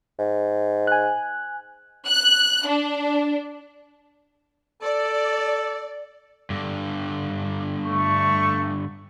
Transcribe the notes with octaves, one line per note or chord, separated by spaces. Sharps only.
G#2
G#5 F#6
F#6
D4
A4 D5
G2 D3
A3 C#6